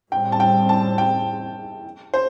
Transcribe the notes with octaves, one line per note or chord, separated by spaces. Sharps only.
A2 G3 C4 G5
A5
G5
A5
G5
C5